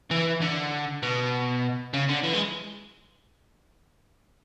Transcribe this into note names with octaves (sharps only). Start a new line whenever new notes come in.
E3
D3
B2
C#3
D3
E3
G#3